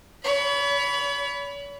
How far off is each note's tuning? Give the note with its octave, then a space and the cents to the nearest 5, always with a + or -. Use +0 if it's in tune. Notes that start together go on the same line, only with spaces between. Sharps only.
C#5 +40 B5 +0